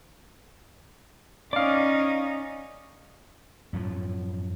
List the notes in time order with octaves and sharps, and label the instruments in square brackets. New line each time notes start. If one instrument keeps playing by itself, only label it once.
[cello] C#4 D#4 [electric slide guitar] D5 F5
[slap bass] F#2 A2 F3